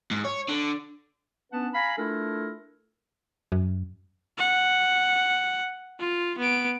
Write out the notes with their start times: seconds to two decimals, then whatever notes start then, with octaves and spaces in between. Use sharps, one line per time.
0.11 G#2
0.25 C#5
0.48 D3
1.52 B3 C#4 D4 B4 F#5 A5
1.74 F5 G#5 A#5 B5
1.98 A3 D4 E4 F4 A4 A#4
3.52 F#2
4.38 F#5
6.00 F4
6.39 B3 D7